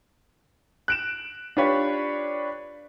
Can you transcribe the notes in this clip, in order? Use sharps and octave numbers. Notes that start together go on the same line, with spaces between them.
F#6 D7 E7
D4 F4 G4 B4 C#5